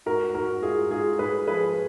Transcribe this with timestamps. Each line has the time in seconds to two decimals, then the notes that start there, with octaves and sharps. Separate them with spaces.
0.06 G#2 F#4 A#4
0.34 G#2 F#4 A#4
0.62 G#2 F4 G#4
0.91 G#2 F4 G#4
1.19 G#2 G#4 B4
1.47 F3 G#4 B4